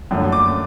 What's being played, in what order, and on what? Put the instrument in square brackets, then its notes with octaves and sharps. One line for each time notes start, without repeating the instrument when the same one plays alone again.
[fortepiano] F#2 D3 F3 A3 C#4
[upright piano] D6